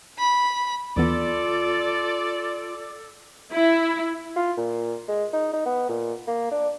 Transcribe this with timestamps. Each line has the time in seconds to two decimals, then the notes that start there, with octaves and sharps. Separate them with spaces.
0.19 B5
0.96 D#2 E3 B3 F4 A4 D5
3.53 E4
4.36 F4
4.57 A#2
5.08 G#3
5.33 D#4
5.53 D#4
5.66 B3
5.89 A#2
6.27 A#3
6.51 D4